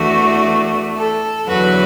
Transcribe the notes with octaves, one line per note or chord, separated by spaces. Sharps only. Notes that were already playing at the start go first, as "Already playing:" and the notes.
Already playing: E2 E3 A3 D4 F#4
A4
E2 D3 F#3 F#4 B4